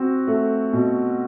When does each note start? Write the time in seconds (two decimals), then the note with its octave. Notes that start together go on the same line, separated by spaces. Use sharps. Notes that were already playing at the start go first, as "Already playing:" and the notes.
Already playing: C4 F#4
0.27 A3
0.73 B2